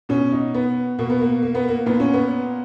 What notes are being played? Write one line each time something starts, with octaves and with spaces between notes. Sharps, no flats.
B2 C#4
D#4
B3
B2 A#3
B3
A#3
A#3
B3
A#3
A#2 B3
C#4
B3